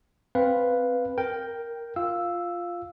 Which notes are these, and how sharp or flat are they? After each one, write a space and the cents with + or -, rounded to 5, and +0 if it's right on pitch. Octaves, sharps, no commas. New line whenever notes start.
C4 +10 B4 +0 F5 +5
A#4 +0 G5 +0
F4 +0 F5 +0 E6 +0